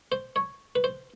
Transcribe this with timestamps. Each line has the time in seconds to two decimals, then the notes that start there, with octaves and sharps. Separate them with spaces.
0.12 C5
0.36 C#5
0.76 B4
0.84 C5